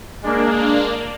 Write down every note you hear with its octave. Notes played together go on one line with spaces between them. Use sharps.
G#3 A#3 D4